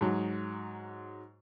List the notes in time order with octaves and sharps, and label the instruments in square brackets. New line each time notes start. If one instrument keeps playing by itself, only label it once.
[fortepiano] G#2 F#3